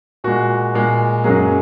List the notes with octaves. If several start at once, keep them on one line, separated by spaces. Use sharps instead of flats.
A#2 G#3 F#4
A#2 G#3
F#2 F#3 G#3 A#3 G#4